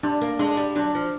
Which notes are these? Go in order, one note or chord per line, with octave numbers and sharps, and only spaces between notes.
G3 D4
A#3
G#3 D4
G3
F#3 D4
F3